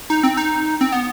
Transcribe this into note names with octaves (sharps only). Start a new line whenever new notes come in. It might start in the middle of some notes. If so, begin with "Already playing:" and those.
D#4
C4
D#4
C4
B3